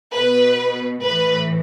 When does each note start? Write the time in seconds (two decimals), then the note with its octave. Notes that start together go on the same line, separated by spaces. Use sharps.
0.17 B2 B4
1.04 A2 E3 B4